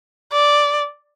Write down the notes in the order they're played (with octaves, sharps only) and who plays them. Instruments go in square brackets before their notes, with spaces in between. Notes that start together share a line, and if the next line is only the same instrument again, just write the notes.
[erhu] D5